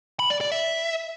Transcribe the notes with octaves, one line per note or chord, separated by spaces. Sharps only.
B5
D5
D5
E5